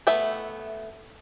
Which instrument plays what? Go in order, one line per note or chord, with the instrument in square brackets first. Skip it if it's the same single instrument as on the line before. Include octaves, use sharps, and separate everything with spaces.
[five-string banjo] A3 B3 B4 E5